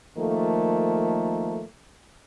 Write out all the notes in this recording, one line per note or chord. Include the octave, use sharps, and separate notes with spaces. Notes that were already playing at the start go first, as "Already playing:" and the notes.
D#3 F3 A3 A#3 A4